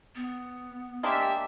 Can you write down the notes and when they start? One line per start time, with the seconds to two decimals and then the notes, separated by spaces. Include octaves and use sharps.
0.16 B3
1.03 G#3 A#3 D4 G4 E5